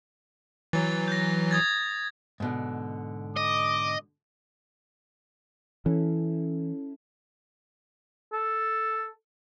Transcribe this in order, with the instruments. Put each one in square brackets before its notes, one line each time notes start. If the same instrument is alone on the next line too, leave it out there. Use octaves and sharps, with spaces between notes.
[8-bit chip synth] E3 F#3 [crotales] A6
[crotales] G6 A#6
D#6 G#6 A6
[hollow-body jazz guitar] G#2 B2 D3
[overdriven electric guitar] D#5 [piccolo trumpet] D6
[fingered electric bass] E3 [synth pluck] C#4 E4 A4
[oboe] A4